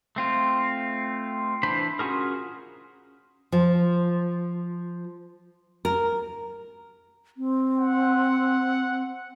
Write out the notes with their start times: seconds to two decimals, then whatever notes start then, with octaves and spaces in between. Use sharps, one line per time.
0.16 A3 C4 F4
1.63 E3 D4 C5 B5
1.99 C#4 F4 F#4 G#4 A#4
3.52 F3
5.85 A#4
7.37 C4
7.78 F#5